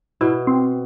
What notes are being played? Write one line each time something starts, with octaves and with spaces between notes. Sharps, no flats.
B2 E4
C4